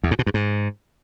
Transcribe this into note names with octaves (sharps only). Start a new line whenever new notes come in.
E2
G#2
B2
G2
G#2